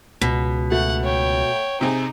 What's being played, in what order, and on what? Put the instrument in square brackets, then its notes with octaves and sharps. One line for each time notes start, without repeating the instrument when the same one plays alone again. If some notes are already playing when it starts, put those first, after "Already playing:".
[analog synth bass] C#2 [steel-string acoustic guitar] B2 [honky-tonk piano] B6
[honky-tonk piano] A3 [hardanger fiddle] F#5
[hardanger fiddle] C#5 G5
[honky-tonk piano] C3 C4 G#4 [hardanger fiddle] D#4